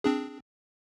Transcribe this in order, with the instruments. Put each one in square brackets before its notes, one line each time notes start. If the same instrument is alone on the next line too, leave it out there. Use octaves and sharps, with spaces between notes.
[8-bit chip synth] C4 D4 G#4